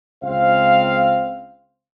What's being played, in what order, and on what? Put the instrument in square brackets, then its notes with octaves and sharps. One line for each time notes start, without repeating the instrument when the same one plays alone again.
[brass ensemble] C#2 C4 C5 F5